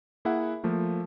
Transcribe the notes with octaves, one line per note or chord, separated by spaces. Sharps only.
A#3 E4 G#4 E5 F#5
F3 A3 A#3